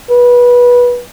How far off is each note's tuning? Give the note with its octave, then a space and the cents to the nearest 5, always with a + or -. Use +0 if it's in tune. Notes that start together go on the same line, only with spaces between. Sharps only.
B4 -20